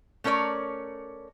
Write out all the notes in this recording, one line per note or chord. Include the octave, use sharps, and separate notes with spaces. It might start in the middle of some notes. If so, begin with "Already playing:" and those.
A3 C#4 A#4 C#5 D5